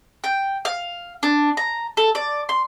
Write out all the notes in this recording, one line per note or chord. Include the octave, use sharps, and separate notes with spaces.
G5
F5
D4
A#5
A4
D5
C6